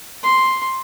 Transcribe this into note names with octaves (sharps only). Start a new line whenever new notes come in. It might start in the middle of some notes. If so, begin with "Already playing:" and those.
C6